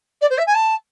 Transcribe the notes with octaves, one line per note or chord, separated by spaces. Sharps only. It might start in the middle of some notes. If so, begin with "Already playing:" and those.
D5
C5
E5
G#5
A5